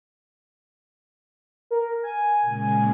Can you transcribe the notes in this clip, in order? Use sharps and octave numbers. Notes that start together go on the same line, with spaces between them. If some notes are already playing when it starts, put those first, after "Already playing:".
A#4
G#5
A#2 C#3 G#3